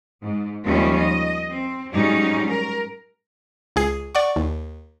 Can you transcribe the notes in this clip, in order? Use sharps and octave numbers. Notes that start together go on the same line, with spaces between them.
G#2
D#2 D#3 F3 G3 C#4 E5
D#5
C4
G#2 F#3 G3 C#4 D#4
A#4
C#2 G#4 C7
D5 F#5 C#6
D#2